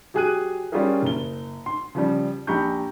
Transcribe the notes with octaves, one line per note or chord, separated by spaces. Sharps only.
F#3 G4 G#4 G#5 F#6 D#7
G3 C#4 F4 G4 G#4 A#4
F#1 G7
C6
C#3 F3 G3
A#1 G4 A#5 B5 C#6 G6